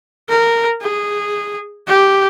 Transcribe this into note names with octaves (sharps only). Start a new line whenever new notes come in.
A#4
G#4
G4